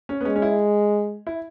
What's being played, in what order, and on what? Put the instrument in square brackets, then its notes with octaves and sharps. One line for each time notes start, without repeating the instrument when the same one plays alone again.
[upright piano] C#4
B3
[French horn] G#3 [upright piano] C#4
[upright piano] C#4
E4
E4